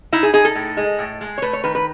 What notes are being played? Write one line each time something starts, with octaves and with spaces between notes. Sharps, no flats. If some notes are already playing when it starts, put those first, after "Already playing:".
D#4 E4
G#4
D#4 G#4
A4
A2
G#3
A2
G#3
C#5
A3 B4
C#5
D#3 B4
B4